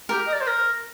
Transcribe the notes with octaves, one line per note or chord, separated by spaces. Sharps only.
G4 A#4
D#5
D5
C5
A#4